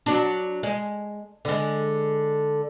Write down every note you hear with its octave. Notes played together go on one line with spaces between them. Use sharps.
F#3 D4
G#3
D3 G#3